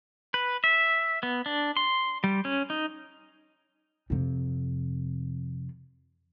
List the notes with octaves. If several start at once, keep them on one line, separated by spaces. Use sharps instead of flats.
B4
E5
B3
D4
C6
G3
C#4
D#4
F2 C3